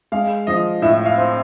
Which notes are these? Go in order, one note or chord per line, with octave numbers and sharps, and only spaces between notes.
G#3 F5
F3 D#5
A2 E5
F5
C4